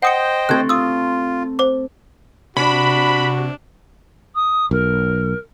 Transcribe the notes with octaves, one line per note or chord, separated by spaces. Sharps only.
C5 D#5 F#5 G5 D#6 C#7
A3 C4 A4 F#6 G#6
F4 D#6 E6
C5 D6
C3 D4 F#4 B5
D#6
B1 A#4